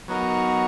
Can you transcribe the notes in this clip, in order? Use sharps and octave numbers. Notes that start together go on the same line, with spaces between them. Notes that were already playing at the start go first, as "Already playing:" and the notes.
F#3 B3 D#4 F#4 A#4